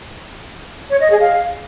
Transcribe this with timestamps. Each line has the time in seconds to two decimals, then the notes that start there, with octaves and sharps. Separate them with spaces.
0.91 C#5
1.01 D#5
1.10 G#4
1.20 F5